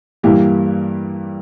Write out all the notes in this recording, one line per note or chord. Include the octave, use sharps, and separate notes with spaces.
G2 E3 A#3 E4 G4